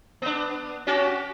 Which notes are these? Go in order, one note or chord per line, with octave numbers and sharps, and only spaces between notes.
B3 D4
C#4 F#4 G4